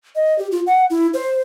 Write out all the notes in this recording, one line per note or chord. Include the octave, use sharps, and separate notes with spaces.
D#5
G4
F4
F#5
E4
C5